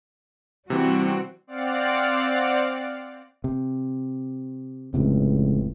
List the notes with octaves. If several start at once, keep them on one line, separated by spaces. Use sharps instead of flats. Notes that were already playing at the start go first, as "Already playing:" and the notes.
C3 E3 G3 C4 F#4
C4 D5 F5 F#5
C3
F1 C#2 A2 C3